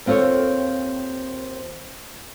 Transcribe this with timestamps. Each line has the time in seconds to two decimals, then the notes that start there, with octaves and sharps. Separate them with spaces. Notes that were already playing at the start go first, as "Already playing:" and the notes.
0.06 D#2 C4 F4 A4 C#5